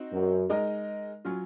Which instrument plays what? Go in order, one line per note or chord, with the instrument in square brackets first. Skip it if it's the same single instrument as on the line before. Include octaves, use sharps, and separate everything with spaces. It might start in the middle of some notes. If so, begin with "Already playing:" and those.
Already playing: [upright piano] C4 D#4 F#4
[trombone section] F#2
[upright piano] G#3 D#4 A#4 D#5
F#3 C#4 F4